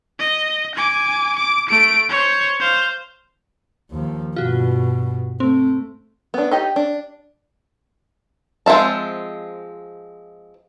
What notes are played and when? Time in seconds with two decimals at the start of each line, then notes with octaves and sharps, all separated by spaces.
0.19 D#5
0.75 G#5 D6
1.36 D6
1.69 A3 D7
2.09 C5 C#5
2.60 C5 F5
3.91 D#2 F3
4.36 G2 B2 F4 F#4
5.40 A3 C4
6.34 B3 D4
6.51 D#4 G4 D#5
6.76 D4
8.66 F3 G#3 C4 E5 A5